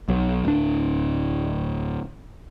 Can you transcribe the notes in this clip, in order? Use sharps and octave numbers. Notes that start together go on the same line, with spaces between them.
B1 F#3
D1 D4